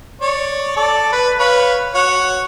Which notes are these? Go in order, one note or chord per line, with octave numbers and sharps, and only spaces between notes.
C#5 D5
A4 D5
B4
B4 C#5 F5
F#4 C#5 F#5